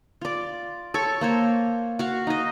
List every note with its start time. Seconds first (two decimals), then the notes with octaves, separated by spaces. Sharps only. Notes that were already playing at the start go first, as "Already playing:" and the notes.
0.21 F4 D5
0.94 A4 C#5 C#6
1.21 A#3 C5 C#5
1.99 F#4 F5
2.27 D#4 D#5